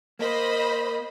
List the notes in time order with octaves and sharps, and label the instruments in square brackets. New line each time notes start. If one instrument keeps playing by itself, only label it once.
[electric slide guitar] A#3 [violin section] C5 D#5 B5